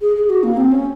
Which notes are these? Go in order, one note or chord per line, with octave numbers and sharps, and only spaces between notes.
G#4
G#4
F#4
A#3
C4
C#4